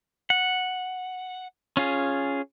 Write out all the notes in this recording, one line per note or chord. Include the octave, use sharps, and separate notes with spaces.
F#5
C#4 F4 G#4